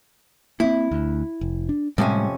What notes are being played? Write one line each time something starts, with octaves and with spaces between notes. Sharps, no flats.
A#3 C4 E4
D2
F1
D4
F2 A2 C3 G3 G#3 C#4